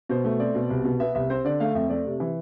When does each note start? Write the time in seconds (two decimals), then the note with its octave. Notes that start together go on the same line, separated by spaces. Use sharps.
0.09 B2 C5
0.24 A3
0.39 C4 D5
0.55 B2
0.70 C2
0.84 B2
1.00 B3 E5
1.15 C2 E5
1.30 C4 C5
1.45 D3 D5
1.60 A3 F5
1.75 F2 E5
1.90 A3 D5
2.05 C3
2.20 E3